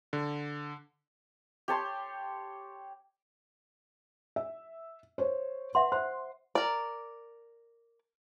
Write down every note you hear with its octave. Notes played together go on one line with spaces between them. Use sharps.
D3
G4 C#5 A5 C6
E5
C5 C#5
B4 E5 F#5 C6
C5 C6
A#4 D5